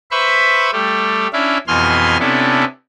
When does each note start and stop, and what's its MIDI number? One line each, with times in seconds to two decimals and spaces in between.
0.11 0.71 71
0.11 0.71 72
0.11 0.71 76
0.11 0.71 83
0.11 0.71 85
0.72 1.27 55
0.72 1.27 57
0.72 1.27 67
1.33 1.58 61
1.33 1.58 62
1.33 1.58 64
1.33 1.58 76
1.33 1.58 77
1.67 2.17 41
1.67 2.17 47
1.67 2.17 52
1.67 2.17 80
1.67 2.17 84
1.67 2.17 89
2.20 2.64 48
2.20 2.64 59
2.20 2.64 61
2.20 2.64 62
2.20 2.64 64
2.20 2.64 69